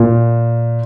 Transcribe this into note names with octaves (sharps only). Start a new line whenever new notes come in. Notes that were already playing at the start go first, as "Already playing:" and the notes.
Already playing: A#2